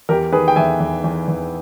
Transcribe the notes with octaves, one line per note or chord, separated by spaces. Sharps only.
E2 G4 A#4
D#3 G#4 B4
G5
E2 E5 G#5
E2
E2
E2